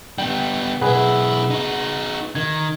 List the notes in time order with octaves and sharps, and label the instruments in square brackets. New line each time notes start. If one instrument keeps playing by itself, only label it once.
[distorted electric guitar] G3 B3 [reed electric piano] G5
[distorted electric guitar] B1 E4 [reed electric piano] G#4 B4 F#5
[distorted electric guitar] D#4 F#4
[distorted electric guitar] D#3 [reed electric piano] G#6